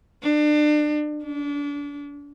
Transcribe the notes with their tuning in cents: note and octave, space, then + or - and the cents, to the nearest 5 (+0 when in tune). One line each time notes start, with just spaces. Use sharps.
D4 +30
D4 -30